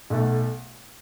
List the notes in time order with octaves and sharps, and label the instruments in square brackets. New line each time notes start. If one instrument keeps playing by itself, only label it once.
[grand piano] B1 B2 A3